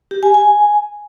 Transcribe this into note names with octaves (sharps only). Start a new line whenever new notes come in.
G4
G#5
G#5